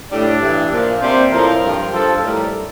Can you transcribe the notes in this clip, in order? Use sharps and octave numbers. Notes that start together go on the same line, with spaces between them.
A2 G3 D4
G2 E3 G3
A#2 F3
C3 G3 C5
A2 F3 A#4
G2 F3
G2 F3 A4
A2 G3 A#4